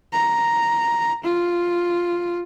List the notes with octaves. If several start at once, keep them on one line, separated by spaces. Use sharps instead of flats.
A#5
F4